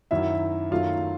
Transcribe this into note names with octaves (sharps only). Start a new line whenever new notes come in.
F#2 D#3 F#3 E4 E5
F#2 D#3 F#3 A3 F4 F5